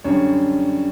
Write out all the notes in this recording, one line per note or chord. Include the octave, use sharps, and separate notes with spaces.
F#2 D3 G3 C#5